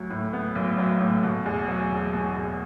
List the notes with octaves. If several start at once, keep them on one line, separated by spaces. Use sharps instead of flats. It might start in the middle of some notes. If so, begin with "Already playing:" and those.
Already playing: D2 F#3
A2
B3
B1
F#3
A2
B2
E2
F#3
E1
B2
E2